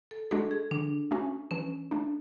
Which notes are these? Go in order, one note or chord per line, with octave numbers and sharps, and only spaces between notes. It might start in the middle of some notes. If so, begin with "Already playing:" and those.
A4
G#3 D4 F#4 A4
G#4
D3 D4
A3 C#4 F#4
E3 C#4
A3 D4